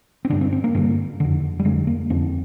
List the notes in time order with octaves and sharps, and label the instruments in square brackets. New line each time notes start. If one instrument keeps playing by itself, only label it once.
[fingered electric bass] C4
G2 D3 D4
C4
C4
A#3
G2 D3
F2 D3
G3
F2 D3 G#3
A#3
F2 D3 C4